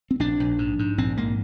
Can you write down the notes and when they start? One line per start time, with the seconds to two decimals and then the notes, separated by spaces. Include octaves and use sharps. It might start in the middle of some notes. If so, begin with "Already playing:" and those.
0.11 C4
0.19 A#1 D4
0.40 A#1
0.58 G#2
0.79 G#2
0.98 A#1 C4
1.17 G#2 A#3